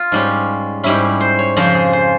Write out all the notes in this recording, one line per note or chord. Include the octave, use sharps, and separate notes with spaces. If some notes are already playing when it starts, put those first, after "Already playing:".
Already playing: F4
G#2 G3 C#4
G#2 G3 C#4 E4
C5
C#5
F2 C#3 F3 C5
G#4
C5